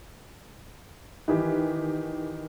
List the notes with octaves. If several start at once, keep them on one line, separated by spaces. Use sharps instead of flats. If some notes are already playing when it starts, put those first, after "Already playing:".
D#3 E3 G4